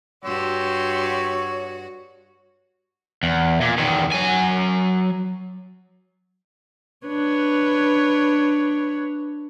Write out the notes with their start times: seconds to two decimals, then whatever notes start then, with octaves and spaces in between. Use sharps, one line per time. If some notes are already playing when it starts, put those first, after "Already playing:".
0.24 G2 F#4 G4 C#5 C6 E6
3.23 E2
3.61 A#2
3.77 E2 D#3
4.12 F#3 G#5
7.07 D4 B4 C#5